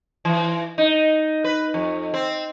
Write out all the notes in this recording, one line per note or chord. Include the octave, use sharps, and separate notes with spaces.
E3
D#4
B4
F2
C4